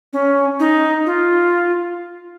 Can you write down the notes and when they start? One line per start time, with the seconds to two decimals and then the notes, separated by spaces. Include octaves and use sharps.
0.13 C#4
0.60 D#4
1.06 F4